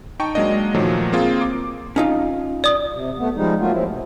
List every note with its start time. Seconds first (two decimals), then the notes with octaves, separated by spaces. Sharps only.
0.20 D#4 G5 A5 C#6
0.35 F#3 G#3 A#3 D4 D#5
0.74 A#2 D#3 F3 F#3 A3
1.13 A#3 C4 F4 G#4
1.41 D6
1.96 C#4 D#4 F4
2.64 D5 D#6
2.94 C3
3.18 A3 B3
3.36 F3 G3 G#3 D#4
3.60 F#3 A3 A#3 F4 F#4
3.72 F3 F#3 G#3 C4 E4
3.88 B2